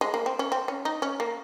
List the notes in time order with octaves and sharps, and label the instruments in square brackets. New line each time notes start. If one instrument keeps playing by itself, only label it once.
[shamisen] G#3
A#3
C4
C#4
C4
C#4
D#4
C#4
A#3